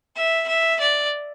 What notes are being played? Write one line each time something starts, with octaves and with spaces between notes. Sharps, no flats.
E5
E5
D5